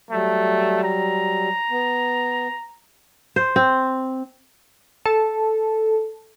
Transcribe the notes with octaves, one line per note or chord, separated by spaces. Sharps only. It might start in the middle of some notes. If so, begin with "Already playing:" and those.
F#3 G3 A3
A#5
B3
C5
C4
A4